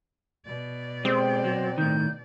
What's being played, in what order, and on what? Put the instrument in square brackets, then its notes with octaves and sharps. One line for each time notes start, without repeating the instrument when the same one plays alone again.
[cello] B2 D5
[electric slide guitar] G#3 G4 [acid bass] C4 [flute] C5
[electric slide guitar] F#3
[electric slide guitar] A2 D#3 [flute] G6